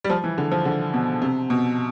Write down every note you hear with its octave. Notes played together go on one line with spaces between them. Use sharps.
G3
F3
E3
D3
F3
D3
B2
C3
B2